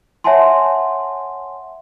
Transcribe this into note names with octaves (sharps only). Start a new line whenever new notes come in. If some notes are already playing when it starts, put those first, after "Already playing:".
C#5 E5 F#5 G#5 A5 C6